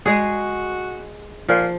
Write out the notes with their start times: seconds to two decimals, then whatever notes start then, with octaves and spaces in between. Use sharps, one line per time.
0.06 G#3 F#4 G#4
1.49 A#2 F3